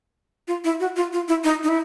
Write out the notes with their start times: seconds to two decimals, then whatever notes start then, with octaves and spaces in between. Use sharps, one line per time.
0.48 F4
0.64 E4
0.80 F#4
0.96 F4
1.13 F4
1.28 E4
1.44 D#4
1.63 D#4
1.68 E4